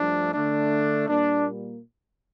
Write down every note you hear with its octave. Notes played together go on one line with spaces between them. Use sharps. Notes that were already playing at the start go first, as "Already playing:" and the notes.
Already playing: G2 F3 A3 D4
D3 A3 D4
A#2 G3 A#3 D4